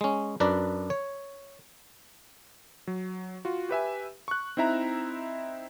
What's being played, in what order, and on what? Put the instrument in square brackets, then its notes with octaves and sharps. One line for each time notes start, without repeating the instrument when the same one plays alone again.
[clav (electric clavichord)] G#3 C#4
F#2 D4 B4 D5 A#5
C#5
[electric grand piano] F#3
F4 F#4
G4 B4 E5 G#5
C#6 F#6
C4 D#4 E4 E5 A#5